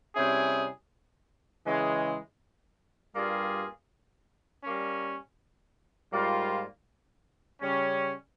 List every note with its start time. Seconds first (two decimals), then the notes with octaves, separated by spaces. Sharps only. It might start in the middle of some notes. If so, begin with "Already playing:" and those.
0.15 C3 G3 C#4 E4 G#4
1.65 C#3 E3 G#3
3.13 G2 G3 A#3 F4 G#4
4.62 G3 A#3 C#4
6.11 G#2 G3 A#3 F4
7.60 C#3 G3 C#4